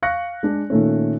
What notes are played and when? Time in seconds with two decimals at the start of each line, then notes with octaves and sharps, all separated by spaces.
0.02 F5 C#6 F#6 A#6 C#7
0.43 G#3 D4
0.70 A#2 D#3 A3 C#4